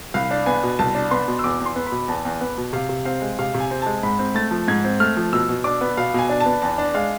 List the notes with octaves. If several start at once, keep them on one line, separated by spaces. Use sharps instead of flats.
C2 F5
D4
B3 G#5
B2
C2 A5
D4
B3 C6
B2
E6
E2 D6
E2
C6
B3
B5
B2
E2 A5
E2
B3
B2
C3 F5
C3
C4 F5
G#3
C3 F5
C3
G#5
C4
G#3 A5
G#2 B5
C4
A3 A6
F3
G#2 G#6
C4
A3 F6
F3
B2 E6
B2
D4 D6
B3
B2 F5
B2 G#5
D4
A5
B3
E2 A5
D4
G#3 F5